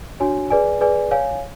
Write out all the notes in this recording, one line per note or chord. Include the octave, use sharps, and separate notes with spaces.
D4 F#4 C#5 G#5
G#4 B4 D5 G#5
G#4 B4 D5 G#5
C#5 F5 G#5